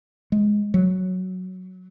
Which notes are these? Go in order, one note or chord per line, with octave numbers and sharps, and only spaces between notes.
G#3
F#3